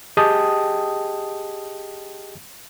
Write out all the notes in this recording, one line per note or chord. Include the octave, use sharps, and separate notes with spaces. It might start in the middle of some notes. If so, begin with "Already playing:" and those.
G4 G#4 D#5 G5 A5 D#6